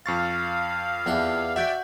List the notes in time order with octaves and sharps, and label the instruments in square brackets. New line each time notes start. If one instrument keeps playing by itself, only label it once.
[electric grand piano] F2 C#6 A6 [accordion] F5
[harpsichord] E2 D4 G5
[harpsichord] F#4 [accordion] D5 G5 [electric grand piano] E5 G6 B6